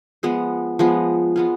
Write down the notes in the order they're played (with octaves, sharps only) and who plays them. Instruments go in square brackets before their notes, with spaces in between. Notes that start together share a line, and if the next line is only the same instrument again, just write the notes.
[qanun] F3 G#3 B3
F3 G#3 B3
G#3 B3 F4